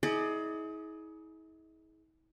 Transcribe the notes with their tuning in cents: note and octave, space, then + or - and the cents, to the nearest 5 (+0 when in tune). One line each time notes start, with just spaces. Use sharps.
E4 -45 G#4 +25 D5 +45